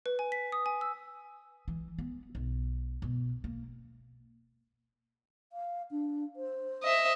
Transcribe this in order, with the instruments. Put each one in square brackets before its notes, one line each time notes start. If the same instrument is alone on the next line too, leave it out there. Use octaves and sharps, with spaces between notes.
[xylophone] B4
G#5
B6
D#6
G#5
E6
[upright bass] E3
B3
B1
B2
A#3
[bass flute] F5
D4
C5
[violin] D#5 E5